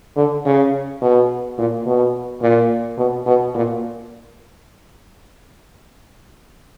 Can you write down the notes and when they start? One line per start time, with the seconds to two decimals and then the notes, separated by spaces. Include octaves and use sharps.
0.16 D3
0.45 C#3
1.02 B2
1.58 A#2
1.86 B2
2.41 A#2
2.97 B2
3.26 B2
3.55 A#2